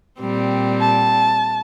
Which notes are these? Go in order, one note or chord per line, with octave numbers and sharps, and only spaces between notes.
A#2 G3 C4
A5